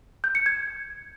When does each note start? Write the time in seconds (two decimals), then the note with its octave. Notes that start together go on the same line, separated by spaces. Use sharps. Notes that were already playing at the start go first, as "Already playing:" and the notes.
0.24 G6
0.35 C#7
0.46 G#6